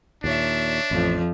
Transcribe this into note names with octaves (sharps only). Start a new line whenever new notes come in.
D#2 A#2 D4 C#5 E5
A1 F2 F3